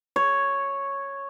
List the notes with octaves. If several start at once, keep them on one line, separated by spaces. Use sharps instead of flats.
C#5